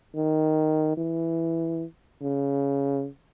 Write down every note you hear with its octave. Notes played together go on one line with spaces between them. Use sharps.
D#3
E3
C#3